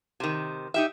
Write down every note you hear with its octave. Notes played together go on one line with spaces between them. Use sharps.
C3 D#3
D#4 G4 E5